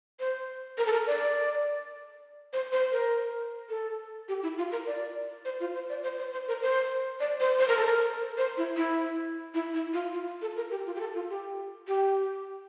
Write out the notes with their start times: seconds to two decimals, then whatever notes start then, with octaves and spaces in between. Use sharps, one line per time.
0.20 C5
0.78 A#4
0.86 A4
0.93 A#4
1.07 D5
2.53 C5
2.72 C5
2.92 A#4
3.70 A4
4.28 G4
4.43 E4
4.58 F4
4.72 A#4
4.87 D5
5.45 C5
5.60 F4
5.75 C5
5.89 D5
6.03 C5
6.18 C5
6.33 C5
6.48 A#4
6.62 C5
7.20 D5
7.40 C5
7.59 C5
7.68 A#4
7.77 A4
7.85 A#4
8.38 C5
8.57 E4
8.76 E4
9.54 E4
9.74 E4
9.93 F4
10.12 F4
10.42 A4
10.57 A#4
10.71 G4
10.86 F4
10.95 G4
11.00 A4
11.15 F4
11.30 G4
11.88 G4